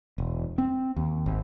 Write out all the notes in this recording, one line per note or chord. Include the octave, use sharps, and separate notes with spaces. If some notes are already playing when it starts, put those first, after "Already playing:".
E1
C4
D#2
G#1